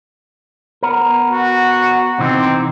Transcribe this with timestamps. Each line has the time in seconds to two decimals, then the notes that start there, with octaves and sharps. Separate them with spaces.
0.83 B3 A#4
1.30 F#4
2.20 C3 E3 C4 D#4